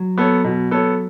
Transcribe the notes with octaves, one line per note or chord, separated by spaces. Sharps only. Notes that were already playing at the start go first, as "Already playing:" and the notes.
Already playing: F#3
B3 A4 C#5
B2
B3 A4 C#5